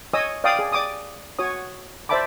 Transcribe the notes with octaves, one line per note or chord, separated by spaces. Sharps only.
C#5 D#5 G#5 D#6 E6
D5 F5 G5 D6 D#6
G#4
D5 D6 D#6
F#4 C#5 D#6
C5 D5 E5 A5 B5 D6